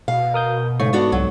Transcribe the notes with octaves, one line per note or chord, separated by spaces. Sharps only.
B2 F5
A#4 D#6 G6
G#2 C#3 A3 C#6
B3 D4 F#4
C2 F#3